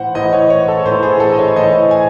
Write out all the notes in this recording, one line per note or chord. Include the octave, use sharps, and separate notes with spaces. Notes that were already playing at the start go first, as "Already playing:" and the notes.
Already playing: A2 E3 C5 F#5
A2 E3 D#5
C#5
C#5
A4
A2 E3 C5
G#4
A4
D#5
C#5
A2 E3 D#5
G#5